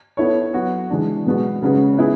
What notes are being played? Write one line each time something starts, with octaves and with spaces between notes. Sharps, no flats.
B3 E4 A4 C#5
F#3 B3 F#4
E3 G#3 D4
B2 G#3 B3 F#4
C#3 G#3 C#4 F#4 B4
B3 E4 G#4 B4